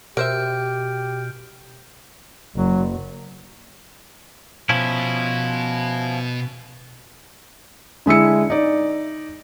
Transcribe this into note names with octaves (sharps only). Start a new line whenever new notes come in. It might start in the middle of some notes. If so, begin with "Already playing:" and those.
B2 G4 A#4 C5 E5 F6 G6 D7
F#1 F#3
B2 F3 C#4 E4
D3 G#3 E4 E6 C#7
D#4 D5